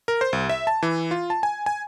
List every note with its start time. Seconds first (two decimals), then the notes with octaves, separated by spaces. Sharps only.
0.08 A#4
0.21 C5
0.33 C2
0.49 E5
0.67 A5
0.83 E3
1.11 F4
1.30 A5
1.43 G#5
1.66 G#5